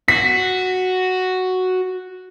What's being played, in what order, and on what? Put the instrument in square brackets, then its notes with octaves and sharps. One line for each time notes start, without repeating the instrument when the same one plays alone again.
[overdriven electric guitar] F#4 [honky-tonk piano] B6